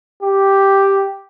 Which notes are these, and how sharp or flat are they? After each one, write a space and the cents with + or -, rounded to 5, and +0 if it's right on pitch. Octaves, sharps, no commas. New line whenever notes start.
G4 +0